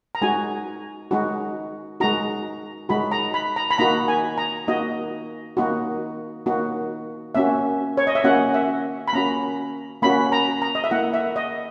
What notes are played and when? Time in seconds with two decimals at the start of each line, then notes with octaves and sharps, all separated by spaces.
0.15 A#5
0.22 G#3 D#4 F#4 G#5
1.11 G#3 D#4 F#4
2.00 G#3 D#4 F#4 A#5
2.89 G#3 D#4 F#4 B5
3.11 A#5
3.34 B5
3.56 A#5
3.71 B5
3.78 A#3 D#4 F#4 A#5
4.08 G#5
4.38 A#5
4.68 A#3 D#4 F#4 D#5
5.57 A#3 D#4 F#4
6.46 A#3 D#4 F#4
7.35 A#3 C#4 F#4 E5
7.97 C#5
8.07 D#5
8.15 E5
8.24 A#3 C#4 F#4 F#5
8.54 E5
9.08 B5
9.13 A#3 C#4 F#4 A#5
10.02 A#3 C#4 F#4 B5
10.32 A#5
10.62 A#5
10.75 D#5
10.84 E5
10.91 A#3 E4 F#5
11.14 E5
11.36 D#5